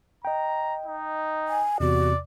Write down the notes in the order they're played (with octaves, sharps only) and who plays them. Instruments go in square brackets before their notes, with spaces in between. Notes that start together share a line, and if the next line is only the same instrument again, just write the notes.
[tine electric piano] D#5 G5 [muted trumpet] A#5
[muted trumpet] D#4
[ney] G#5
[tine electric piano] E2 C3 [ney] F#4 [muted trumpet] D5